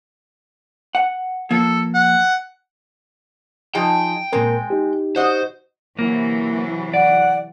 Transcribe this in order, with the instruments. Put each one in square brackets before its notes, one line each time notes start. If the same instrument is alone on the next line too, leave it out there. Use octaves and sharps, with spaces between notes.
[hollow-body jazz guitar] F#5
[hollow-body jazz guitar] F3 A#3 [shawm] A4
[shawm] F#5
[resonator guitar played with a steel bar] F3 D#4 G#4 [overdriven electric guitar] G5
[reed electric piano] A#2 A#4 [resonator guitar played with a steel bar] G#3 C4
[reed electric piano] D#4 G4
[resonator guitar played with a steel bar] F#4 D#5 [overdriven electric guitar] C5
[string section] C3 E3 F#3 [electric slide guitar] A#3
[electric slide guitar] D5 [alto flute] F#5